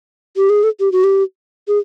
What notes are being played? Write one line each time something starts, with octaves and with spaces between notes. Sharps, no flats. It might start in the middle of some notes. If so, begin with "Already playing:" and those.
G4
G#4
A4
G4
F#4
G4
G#4